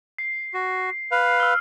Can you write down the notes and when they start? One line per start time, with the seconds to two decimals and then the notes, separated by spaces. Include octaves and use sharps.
0.18 C7
0.54 F#4
1.11 B4 F5
1.40 E6 F6